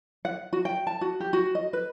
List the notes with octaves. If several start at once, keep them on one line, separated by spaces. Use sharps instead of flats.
F#5
F#4
G5
A5
F#4
G4
F#4
D#5
B4